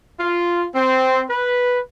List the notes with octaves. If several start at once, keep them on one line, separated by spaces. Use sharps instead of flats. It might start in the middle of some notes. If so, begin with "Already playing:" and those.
F4
C4
B4